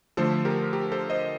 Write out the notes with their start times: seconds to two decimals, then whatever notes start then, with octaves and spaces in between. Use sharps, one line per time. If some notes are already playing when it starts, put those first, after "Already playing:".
0.17 D3 F3 A3 A4 C5
0.45 G4 A#4
0.73 G4 A#4
0.92 A4 C5
1.10 C5 D#5